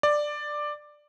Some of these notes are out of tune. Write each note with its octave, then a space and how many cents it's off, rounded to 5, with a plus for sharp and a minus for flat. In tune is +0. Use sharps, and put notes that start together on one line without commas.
D5 +10